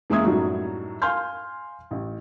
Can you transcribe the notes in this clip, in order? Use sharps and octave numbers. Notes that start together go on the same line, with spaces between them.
E2 G#3 A#3 E5 D#6 G#6
F#2 A2 F#3 G3 D#4 F#4
F5 G#5 C6 F6 G6
A1